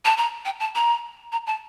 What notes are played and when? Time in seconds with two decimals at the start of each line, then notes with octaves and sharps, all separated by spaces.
0.05 A5
0.17 A#5
0.45 G5
0.60 A5
0.75 A#5
1.32 A#5
1.47 A5